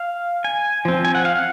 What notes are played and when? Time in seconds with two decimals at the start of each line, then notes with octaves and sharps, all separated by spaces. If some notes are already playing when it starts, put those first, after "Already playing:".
Already playing: F5
0.44 G#5
0.85 F3 C4
1.05 G#5
1.15 F#5
1.25 F5
1.35 F#5